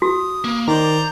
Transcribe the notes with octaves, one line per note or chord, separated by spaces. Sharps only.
F#4 D#6
A#3
D#3 C5 D5 A#5